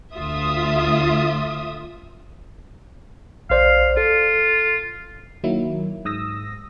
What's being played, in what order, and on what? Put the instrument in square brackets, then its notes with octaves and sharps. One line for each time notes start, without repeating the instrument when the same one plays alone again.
[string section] D2 F4 E5 D#6
[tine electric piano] A#1 C5 D5 [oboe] F5
[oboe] F4 [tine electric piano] A4
[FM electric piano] D#3 F#3 A#3 E4
G#2 D#6 E6 A#6